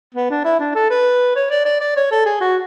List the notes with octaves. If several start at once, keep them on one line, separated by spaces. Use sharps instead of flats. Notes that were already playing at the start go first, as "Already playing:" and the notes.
B3
D4
E4
D4
A4
B4
C#5
D5
D5
D5
C#5
A4
G#4
F#4